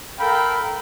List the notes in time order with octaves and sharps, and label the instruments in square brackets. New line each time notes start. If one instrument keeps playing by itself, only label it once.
[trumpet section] A4 A#4 F5 G5 B5